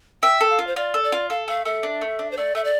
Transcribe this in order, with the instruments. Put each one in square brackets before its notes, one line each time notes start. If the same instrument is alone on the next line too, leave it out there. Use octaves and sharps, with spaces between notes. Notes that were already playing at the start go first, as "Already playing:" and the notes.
[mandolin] E5 [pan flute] G5
[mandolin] A4
[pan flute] F5
[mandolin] F4
[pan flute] C5
[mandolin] F4 [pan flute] D5
[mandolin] A4
[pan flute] D5
[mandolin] F4
[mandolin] A4 [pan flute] F5
[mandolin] A3 [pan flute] F5
[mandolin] A3 [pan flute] E5
[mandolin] D4
A3
D4
[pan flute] C5
[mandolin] A3 [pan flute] D5
[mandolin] A3 [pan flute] E5
[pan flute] D5